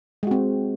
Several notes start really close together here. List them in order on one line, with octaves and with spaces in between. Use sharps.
G#3 F#4 C4